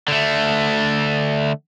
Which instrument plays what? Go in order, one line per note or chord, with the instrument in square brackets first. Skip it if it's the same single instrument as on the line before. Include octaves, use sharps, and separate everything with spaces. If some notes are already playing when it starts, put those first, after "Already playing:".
[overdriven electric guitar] D3 A3